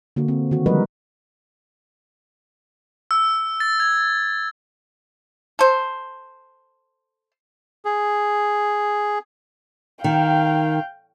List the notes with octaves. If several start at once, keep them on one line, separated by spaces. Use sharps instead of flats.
D3 A#3 F#4
C4
D#3 F#4
F3 G3 G#3 A#4 B4 D#5
E6
A6
G#6
A4 C5
G#4
D#3 F5 G5